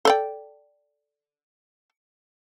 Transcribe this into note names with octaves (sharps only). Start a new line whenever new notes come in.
A4 D5 G5